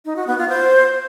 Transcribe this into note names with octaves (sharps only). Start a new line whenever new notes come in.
D#4
F#4
B3
F4
C5